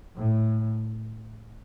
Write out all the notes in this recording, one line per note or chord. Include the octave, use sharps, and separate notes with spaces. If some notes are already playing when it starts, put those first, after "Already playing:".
A2